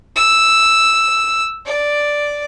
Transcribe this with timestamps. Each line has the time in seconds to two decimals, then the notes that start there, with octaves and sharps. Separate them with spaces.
0.16 E6
1.66 D5